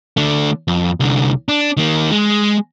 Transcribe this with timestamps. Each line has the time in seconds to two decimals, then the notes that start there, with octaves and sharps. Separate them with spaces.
0.17 D3 A3
0.68 F2
1.00 C2 D3
1.49 D4
1.77 D#3 A#3
2.11 G#3